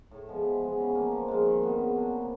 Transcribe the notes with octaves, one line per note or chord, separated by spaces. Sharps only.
A2
F3 G#3 B3
E3
G#3 B3
C#3
F3 A#3
F3
G#3 C4 F4
D#3
G3 B3
C#3
F#3 A#3 D4
C3